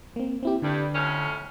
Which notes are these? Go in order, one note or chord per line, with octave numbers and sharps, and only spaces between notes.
A#3 C4
C4 E4 G4
G2 D3 G3
F2 A2 C#4